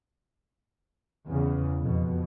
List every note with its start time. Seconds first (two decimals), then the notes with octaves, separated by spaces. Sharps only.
1.28 E2 C#3
1.82 F2 B2